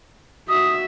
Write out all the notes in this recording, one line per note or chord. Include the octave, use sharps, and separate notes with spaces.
F#4 E5 D#6